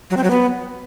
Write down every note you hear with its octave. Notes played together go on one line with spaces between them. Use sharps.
F#3
C4
F#3
B3